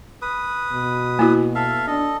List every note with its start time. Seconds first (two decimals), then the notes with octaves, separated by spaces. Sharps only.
0.22 B4 D#6
0.73 B2
1.19 A#3 E4 F#4
1.55 A4 E5 F5
1.87 D4 A4 D#5